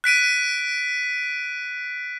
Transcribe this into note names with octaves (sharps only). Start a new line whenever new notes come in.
F#6 B6 D7 D#7